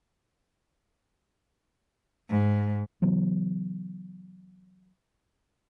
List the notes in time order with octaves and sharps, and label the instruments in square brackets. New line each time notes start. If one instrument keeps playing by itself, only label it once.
[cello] G#2
[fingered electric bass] C#3 E3 F#3 B3